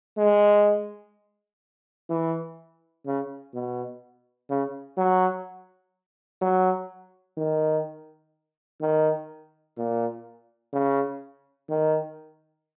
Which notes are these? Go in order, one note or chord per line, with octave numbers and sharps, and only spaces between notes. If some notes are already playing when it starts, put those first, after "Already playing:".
G#3
E3
C#3
B2
C#3
F#3
F#3
D#3
D#3
A#2
C#3
D#3